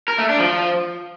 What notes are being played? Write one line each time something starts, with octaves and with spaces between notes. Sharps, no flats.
A#4
A3
D4
F3